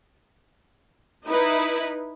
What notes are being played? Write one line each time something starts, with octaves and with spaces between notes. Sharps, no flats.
D#4 E4 B4